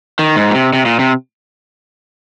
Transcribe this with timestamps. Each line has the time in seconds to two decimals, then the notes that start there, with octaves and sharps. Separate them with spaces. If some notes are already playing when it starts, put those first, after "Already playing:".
0.19 D#3
0.36 G#2
0.50 A#2
0.54 C3
0.73 C3
0.85 A#2
0.99 C3